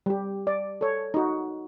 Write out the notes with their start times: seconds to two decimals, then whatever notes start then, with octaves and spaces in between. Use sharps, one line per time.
0.06 G3 G4
0.47 D5
0.81 A4 C#5
1.14 D#4 F#4